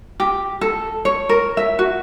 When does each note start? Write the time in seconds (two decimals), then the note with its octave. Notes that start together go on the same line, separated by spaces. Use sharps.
0.20 G4
0.61 A4
1.05 C#5
1.29 A#4
1.57 E5
1.79 F#4